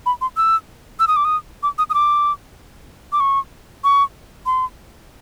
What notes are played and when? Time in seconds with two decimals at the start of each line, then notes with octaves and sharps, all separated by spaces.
0.06 B5
0.21 C6
0.37 E6
1.00 E6
1.08 D#6
1.16 D6
1.25 D#6
1.63 D6
1.78 D#6
1.90 D#6
1.94 D6
3.13 D6
3.20 C#6
3.84 C#6
4.46 C6